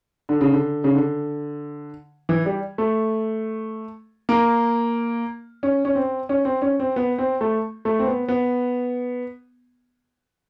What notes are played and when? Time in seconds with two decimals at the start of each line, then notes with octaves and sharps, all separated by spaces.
0.29 D3
0.41 C#3
0.51 D3
0.84 C#3
0.95 D3
2.29 E3
2.46 G3
2.78 A3
4.29 A#3
5.63 C#4
5.85 C#4
5.95 C4
6.29 C#4
6.45 C4
6.62 C#4
6.80 C4
6.96 B3
7.18 C4
7.41 A3
7.85 A3
7.99 C4
8.07 B3
8.28 B3